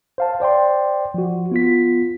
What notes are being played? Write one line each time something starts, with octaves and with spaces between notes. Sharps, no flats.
C5 F5 A5
C5 D5 G5 C6
F3 F#4
B3 F4 B6